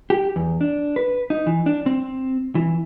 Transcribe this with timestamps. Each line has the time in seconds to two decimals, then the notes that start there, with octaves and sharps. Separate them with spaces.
0.10 G4
0.36 E2
0.61 D4
0.96 B4
1.30 D#4
1.47 E3
1.66 D4
1.86 C4
2.55 E3